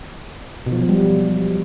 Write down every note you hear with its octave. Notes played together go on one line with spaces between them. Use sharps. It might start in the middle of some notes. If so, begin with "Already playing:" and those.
B2
F3
F#3
F3
G3